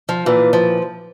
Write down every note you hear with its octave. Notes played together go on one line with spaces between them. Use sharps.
F3
A#2 E3
F3